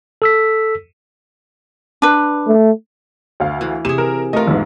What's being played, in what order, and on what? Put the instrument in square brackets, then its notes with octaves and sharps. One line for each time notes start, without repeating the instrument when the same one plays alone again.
[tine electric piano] A4 E6 B6
[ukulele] D4 B4
[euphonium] A3
[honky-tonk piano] D2 F5
[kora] E3
[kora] C3 G#4 [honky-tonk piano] E7
[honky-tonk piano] A#4
[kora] A3 F4 [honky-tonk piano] A#4 D#5
[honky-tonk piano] A#1 E2 G#2